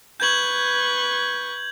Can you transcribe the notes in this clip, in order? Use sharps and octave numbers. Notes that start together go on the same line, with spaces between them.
B4 C#6 G6 G#6 F#7